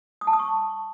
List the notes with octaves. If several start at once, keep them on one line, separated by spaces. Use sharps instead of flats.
D#6
A5
D#6
C#6